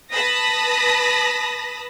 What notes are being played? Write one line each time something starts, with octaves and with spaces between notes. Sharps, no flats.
B4 A5 B5 D#6 A#6